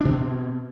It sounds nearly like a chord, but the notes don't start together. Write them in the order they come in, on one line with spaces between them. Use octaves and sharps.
D4 B2 C4